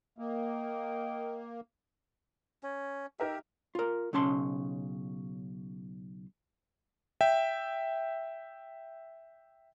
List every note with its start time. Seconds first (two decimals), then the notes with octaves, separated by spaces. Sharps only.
0.19 A#3 D#5 F5 G5
2.63 C#4
3.20 D#4 G4 A#4 E5
3.75 F4 A#4
4.13 B1 C#3 C#4 A5 C6
7.21 E5 G5